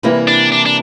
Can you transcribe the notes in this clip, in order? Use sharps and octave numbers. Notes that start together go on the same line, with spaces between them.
C3 E3 G3 A#3 E4
D4
D4
D4